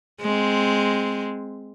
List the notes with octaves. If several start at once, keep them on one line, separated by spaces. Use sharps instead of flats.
G#3 C4